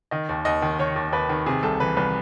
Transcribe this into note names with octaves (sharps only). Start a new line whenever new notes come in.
D#3 D#5
D#2
D#2 D#5
D#3
D#3 C#5
D#2
D#2 B4
D#3
C3 G#4
C2 A4
E3 B4
C2 B4